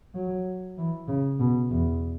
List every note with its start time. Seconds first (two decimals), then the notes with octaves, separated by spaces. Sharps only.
0.15 F#3
0.77 E3
1.08 C#3
1.40 B2
1.71 E2